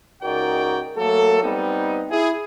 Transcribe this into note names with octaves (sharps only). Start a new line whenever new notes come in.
C#2 D#4 F#4 A#4 D5 G5
F#3 A3 A#3 A4
G3 B3 C4 D#4
E4 G#4